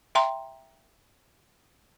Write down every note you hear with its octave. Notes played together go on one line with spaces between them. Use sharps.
E5 G5 A#5 C6